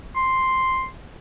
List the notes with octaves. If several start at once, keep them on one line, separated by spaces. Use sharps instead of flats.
C6